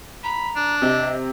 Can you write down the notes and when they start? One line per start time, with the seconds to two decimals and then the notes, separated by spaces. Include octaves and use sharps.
0.24 A#5 B5
0.56 D4
0.82 C3 D#5